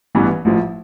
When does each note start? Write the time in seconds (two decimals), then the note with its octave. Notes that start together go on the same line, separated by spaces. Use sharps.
0.15 A1 G2 E3 B3
0.45 A1 A2 F3